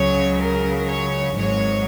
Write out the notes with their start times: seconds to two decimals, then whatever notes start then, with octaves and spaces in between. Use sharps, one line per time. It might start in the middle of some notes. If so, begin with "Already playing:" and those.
Already playing: C#2 C#3 F#3 C#5
0.41 A#4
0.88 C#5
1.36 G#1 G#2 F#3 C#5